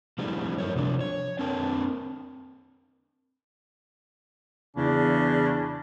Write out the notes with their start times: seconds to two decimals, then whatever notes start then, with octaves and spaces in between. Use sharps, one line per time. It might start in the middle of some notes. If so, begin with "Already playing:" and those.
0.19 F3 G3 A3 C4 D4 E4
0.58 G2 A#4 C#5
0.75 C3 F3 D4
1.01 C#5
1.39 C4 D4 A#4 A5
4.77 E2 C#3 D4